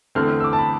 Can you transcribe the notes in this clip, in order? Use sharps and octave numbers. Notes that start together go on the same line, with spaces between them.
E2 D3 A3 C4 F6
E6
D6
A5
B5